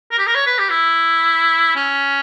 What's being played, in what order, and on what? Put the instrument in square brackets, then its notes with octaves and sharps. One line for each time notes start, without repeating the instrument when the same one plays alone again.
[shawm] A#4
G4
A#4
C#5
B4
G4
E4
C#4